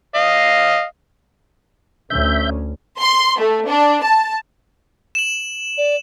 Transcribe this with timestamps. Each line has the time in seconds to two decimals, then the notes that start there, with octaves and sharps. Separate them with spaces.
0.15 D#5 F5
2.10 D2 C#4 E5 G6
3.00 C6
3.39 A3
3.68 D4
4.03 A5
5.15 E7 F#7
5.78 D5